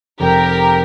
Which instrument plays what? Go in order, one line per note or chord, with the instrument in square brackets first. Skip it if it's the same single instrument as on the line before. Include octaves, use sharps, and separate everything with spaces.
[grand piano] F1 [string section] G4 A#4